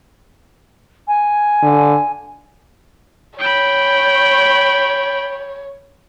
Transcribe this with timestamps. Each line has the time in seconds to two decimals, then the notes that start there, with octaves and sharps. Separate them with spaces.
1.08 G#5
1.62 D3
3.39 C#5 G5 B5